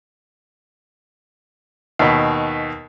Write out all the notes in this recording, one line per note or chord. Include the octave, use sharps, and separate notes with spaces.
D#2 B2